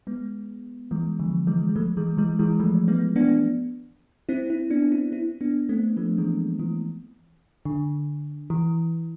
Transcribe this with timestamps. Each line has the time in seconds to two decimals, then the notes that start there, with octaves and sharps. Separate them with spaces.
0.07 G#3 B3
0.91 E3 G#3
1.19 D3 F3
1.47 E3 G#3
1.69 G#3
1.76 F3 A3
1.97 E3 G#3
2.17 E3 G#3
2.39 E3 G#3
2.60 F3 A3
2.88 G#3 B3
3.16 B3 D4
4.29 C4 E4
4.50 C4 E4
4.70 B3 D4
4.92 C4 E4
5.12 C4 E4
5.41 B3 D4
5.69 A3 C4
5.97 F3 A3
6.18 E3 G#3
6.59 E3
7.65 D3
8.50 E3